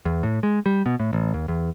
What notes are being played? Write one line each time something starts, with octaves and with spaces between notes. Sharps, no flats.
E2
A2
G#3
G3
B2
A2
A1
D#2
E2